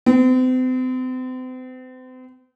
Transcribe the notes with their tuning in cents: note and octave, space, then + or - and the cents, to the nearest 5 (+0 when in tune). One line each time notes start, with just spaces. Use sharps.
C4 -40